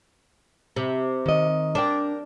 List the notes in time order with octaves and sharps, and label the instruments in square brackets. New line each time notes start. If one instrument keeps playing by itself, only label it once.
[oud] C3
[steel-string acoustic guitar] D#3 D#5
[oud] D4 [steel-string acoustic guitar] A#4 G5